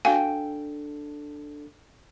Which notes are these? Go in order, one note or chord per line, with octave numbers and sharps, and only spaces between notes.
D4 F#4 A4 F5 G5 G#5